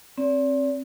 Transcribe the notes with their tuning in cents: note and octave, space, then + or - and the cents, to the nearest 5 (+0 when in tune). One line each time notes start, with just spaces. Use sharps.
C4 +30 D5 -40